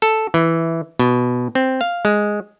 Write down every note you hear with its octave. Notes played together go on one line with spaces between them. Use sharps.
A4
E3
B2
C4
F5
G#3